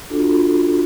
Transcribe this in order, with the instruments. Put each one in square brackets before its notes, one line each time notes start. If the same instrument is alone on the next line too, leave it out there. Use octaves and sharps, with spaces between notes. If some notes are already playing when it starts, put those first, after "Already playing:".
[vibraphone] D4 F4 F#4 A4